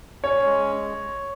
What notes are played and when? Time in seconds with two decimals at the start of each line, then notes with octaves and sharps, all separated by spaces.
0.24 C#4 C#5
0.45 G#3